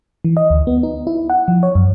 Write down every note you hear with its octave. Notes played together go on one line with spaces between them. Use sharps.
E3
D#5
D2
B3
D#4
E4
F#5
F3
C#5
F#2